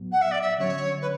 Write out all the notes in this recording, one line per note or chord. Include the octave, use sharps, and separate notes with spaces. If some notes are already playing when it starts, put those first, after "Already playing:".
Already playing: A2 F#3 B3
F#5
E5
D5
E5
D3 F#3 C#4 C#5
B4